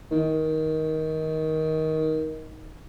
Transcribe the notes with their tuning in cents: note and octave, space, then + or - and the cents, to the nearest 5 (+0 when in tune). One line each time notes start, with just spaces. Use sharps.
D#3 +15